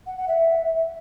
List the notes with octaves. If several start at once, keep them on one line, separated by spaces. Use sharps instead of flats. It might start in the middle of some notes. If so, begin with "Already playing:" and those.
F#5
F#5
E5